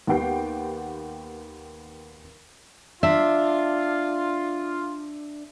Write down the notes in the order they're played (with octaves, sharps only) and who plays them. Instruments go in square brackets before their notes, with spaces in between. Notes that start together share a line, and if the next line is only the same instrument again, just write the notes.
[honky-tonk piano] D#2 B3 G4 F#5 G5 C7
[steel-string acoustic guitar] D4 [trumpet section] F4 [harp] E5